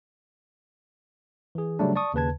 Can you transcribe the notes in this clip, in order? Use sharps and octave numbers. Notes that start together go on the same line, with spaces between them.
E3 G#4
C#3 F#3 G3 A3 D4
D5 A5 C#6 D#6
D#2 C#3 B4 A5 G#6